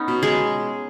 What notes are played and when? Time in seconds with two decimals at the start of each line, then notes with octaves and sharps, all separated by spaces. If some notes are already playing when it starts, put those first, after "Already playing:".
Already playing: B3 C#4 D#4
0.08 B2
0.23 G#3 G#4